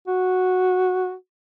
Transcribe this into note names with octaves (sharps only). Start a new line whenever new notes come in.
F#4